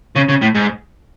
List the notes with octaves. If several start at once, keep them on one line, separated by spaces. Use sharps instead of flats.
C#3
C#3
A2
G#2